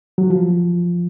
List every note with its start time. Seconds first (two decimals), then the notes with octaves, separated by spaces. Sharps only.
0.18 F#3
0.30 F3